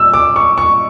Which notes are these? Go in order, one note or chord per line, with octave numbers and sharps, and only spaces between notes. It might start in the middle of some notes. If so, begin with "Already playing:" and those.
Already playing: E6
D6
C#6
C#6